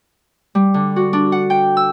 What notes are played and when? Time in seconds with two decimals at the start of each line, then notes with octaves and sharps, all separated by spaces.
0.55 G3
0.74 D3
0.96 F#4
1.13 D4
1.32 F#5
1.50 G5
1.77 E6